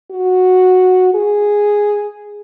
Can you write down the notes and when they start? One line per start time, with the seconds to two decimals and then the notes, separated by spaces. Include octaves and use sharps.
0.11 F#4
1.14 G#4